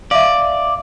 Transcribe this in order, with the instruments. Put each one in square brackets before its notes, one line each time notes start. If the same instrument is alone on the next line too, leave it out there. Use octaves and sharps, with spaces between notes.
[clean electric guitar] D5 [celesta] E5 F5